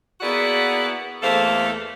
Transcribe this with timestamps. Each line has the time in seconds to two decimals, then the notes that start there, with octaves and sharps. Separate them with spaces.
0.21 A#3 B3 E4 F#4 G#4 D5
1.22 E2 A3 A#3 A4 C5 F5